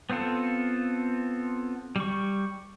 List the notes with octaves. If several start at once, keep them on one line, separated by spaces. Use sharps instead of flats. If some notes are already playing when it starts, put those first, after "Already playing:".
B3 C4 F4 A4
G3 C#6